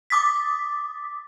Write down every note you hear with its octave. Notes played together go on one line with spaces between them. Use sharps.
D6 D#6 A6 B6